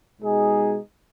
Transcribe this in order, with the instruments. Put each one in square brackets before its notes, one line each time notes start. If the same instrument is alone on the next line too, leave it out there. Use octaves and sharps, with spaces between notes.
[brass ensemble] B2 G#3 D#4 G#4 D#5